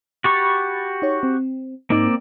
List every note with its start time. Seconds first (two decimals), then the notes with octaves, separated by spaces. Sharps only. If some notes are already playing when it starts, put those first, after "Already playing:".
0.24 F#4 G4 B5 C#6 D6 A6
1.02 D#4 C#5
1.23 C4
1.90 G#2 A#3 C4 D#4 D5